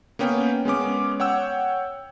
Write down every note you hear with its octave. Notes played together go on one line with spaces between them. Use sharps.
A#3 B3 C#4 G5
G#3 B3 C#4 D6
C#5 F#5 G5 E6